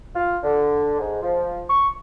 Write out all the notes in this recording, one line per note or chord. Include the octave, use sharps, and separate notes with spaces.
F4
D3
G#2
F3
C#6